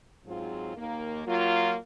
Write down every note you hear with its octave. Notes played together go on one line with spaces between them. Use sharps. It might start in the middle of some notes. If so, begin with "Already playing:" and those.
G#2 F#3 C4 F4 G#4
D#2 D#3 A#3
F#3 A#3 F4